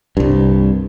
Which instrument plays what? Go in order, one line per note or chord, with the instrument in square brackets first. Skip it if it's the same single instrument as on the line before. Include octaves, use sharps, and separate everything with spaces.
[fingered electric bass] C2 G2